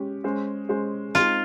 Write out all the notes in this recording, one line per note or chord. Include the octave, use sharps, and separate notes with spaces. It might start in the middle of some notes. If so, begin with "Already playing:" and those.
Already playing: G#3 C#4 G4
G#3 C#4 G#4 C5
G#3 C#4 G#4 C5
G#3 C4 D#4 F4 G#4